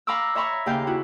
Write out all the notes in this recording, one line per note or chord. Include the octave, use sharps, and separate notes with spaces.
F5 A#5 B5 C#6 D6 E6
C#5 E5 A#5 B5 C#6
D#2 C#3 G4 F5 G6
E4 F#4